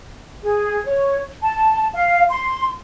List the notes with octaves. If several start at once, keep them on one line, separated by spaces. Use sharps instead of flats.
G#4
C#5
A5
F5
C6